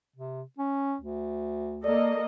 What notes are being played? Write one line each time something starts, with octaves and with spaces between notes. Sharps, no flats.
C3
C#4
D2
A#3 A4 D5 D#5